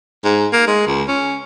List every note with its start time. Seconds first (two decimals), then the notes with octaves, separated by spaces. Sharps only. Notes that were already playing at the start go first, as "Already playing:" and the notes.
0.24 G#2
0.53 A#3
0.67 G#3
0.87 C#2
1.08 C#4